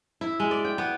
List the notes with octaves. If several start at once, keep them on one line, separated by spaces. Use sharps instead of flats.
E4
G#3
D5
G5
B3